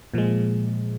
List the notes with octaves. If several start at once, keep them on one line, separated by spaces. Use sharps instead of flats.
A#2 F3 G#3